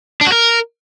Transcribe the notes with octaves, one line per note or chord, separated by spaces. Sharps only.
D4
F#4
A#4